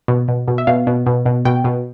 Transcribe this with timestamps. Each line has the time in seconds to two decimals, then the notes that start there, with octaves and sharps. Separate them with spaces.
0.08 B2
0.28 B2
0.48 B2
0.58 E5
0.67 B2 F5
0.87 B2
1.06 B2
1.26 B2
1.45 B2 G5
1.64 B2